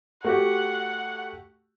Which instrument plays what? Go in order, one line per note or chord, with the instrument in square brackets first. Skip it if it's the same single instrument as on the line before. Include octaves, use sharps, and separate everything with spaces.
[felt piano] A3 F#4 G4 [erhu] F#5